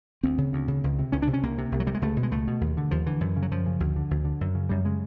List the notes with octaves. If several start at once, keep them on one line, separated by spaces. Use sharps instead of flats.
D2 C4
C#3
D2
C#3
C#2
C3
C#2 C#4
C3 D4
C#4
C2 A#3
C3
C2
F#3
C3 G3
G#3
C#2 A3
B2
G#3
C#2 A3
B2
D#2
D3
D#2 F3
D3 E3
F#2
C#3
F#3
F#2 F3
C#3
D2
D3
D2
D3
F#2
C#3
F#2 G3
C#3 G#3